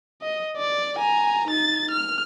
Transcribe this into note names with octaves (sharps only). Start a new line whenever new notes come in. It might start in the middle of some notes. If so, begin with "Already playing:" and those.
D#5
D5
G#5 A#5
D#4 A6
F6